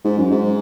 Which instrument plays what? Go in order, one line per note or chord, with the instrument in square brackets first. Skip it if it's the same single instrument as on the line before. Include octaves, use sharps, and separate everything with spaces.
[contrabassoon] G#2
F#2
G#2